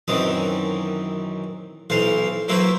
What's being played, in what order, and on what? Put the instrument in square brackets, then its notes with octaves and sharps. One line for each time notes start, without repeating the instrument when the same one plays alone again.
[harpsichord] F#2 D#3 E3 C4 D6 D#6
B1 E3 C5 F5
F#3 A#3 E4 B4 C5 E5